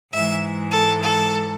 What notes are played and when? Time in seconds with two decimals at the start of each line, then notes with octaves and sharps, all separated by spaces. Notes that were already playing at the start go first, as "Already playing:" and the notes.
0.12 G#2 E3 G#3 E5
0.71 A4
1.02 A4